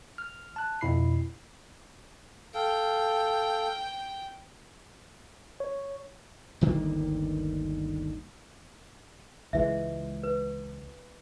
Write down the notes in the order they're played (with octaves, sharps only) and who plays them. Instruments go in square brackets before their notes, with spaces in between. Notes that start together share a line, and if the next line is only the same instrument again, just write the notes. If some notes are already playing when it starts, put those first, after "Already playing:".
[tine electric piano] F6
A5 F#6
F2 B2 E4 B5 C7
[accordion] A4 F5 [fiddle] G5
[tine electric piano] C#5
[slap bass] G1 D2 D#3 A#3
[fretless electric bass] C#2 E3 G#3 [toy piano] E5
[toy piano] B4